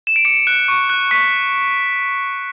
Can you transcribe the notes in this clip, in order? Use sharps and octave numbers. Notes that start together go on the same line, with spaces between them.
E7
D7
D6 C#7
F#6 C#7
C#6
F#6
C#6 B6